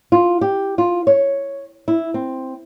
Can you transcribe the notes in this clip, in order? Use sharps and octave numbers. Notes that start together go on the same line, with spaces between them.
F4
G4
F4
C#5
E4
C4